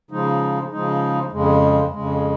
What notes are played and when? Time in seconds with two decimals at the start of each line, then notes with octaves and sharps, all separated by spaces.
0.11 C#3 F3 G#3 D#4
0.71 C#3 F3 G#3 D#4
1.32 F2 C#3 G#3
1.92 F2 C#3 G#3